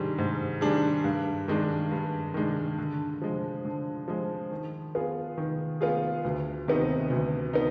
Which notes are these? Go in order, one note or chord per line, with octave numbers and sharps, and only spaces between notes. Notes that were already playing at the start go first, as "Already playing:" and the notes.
Already playing: G#2 D#3 G3 D4 G#4
G#2
D#3 G3 D4 G#4
G2
D#3 G#3 D4
G2
D#3 G#3 D4
D3
F3 G#3
D3
F3 G#3
D#3
B3 F4 G#4
D#3
B3 F4 G#4
D2
C3 D#3 B3 D#4
D2
B3 D#4